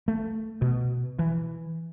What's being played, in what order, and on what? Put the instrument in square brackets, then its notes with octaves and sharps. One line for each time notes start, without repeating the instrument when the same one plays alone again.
[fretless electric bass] A3
B2
E3